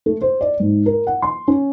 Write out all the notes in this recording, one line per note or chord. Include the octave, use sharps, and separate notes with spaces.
A3
C5
D5
G#2
A#4
F#5
C6
C#4